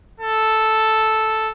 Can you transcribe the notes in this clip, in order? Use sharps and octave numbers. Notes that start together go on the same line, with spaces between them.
A4